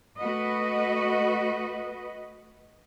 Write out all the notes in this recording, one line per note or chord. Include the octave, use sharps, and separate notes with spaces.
A3 F#4 B4 D#5